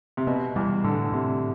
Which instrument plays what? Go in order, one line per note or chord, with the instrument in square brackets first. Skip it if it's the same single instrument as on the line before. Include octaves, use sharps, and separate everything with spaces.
[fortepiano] C3
[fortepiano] B2 [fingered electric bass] B3
[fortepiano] E2 [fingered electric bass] G3
[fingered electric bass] A2 [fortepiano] D3
[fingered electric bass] A2 [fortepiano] C3